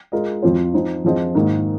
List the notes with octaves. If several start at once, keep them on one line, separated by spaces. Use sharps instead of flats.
G#3 F4 A#4 D#5
F2 F3 C4 F4 C5
F3 C4 D#4
F2 F3 C4 G#4 D#5
G#2 D#3 A#3 D#4 G#4